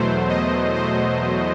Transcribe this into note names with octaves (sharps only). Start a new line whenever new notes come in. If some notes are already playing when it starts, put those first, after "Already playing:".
Already playing: E2 B2 F#3 A3 C5
D#5
C5